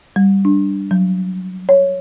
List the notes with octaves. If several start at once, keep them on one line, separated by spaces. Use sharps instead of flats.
G3
D4
F#3
C#5